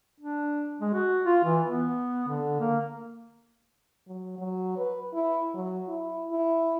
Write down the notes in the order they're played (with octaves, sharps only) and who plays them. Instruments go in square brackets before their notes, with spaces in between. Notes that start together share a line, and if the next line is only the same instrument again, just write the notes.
[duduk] D4
G#3
F#4
F4
E3
B3
D3
A#3
[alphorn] F#3
F#3
B4
E4
F#3
E4
E4